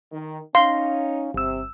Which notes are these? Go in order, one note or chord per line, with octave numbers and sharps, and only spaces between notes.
D#3
C#4 D#4 F5 C6
G1 C3 E6